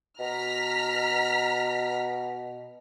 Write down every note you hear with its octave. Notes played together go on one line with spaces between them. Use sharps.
B2 A#5 F6 B6